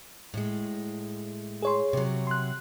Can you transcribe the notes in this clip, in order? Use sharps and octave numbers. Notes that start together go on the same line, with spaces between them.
A2 G#3
G#4 C#5 C6
C3 F#3
C6 F#6